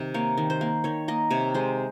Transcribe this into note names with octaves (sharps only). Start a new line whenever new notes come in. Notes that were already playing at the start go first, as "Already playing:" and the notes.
Already playing: C3 D#3
A#3 C#5
D#3
C5
A#3
D#3 C#5
A#3 D#5
C3 C#5
G#3 C5